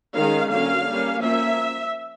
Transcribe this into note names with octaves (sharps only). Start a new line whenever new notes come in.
D#3 G#3 C#4 F5
D3 F#3 A#3 C#4 F5
G3 A#3 C#4
F3 A#3 C#4 E5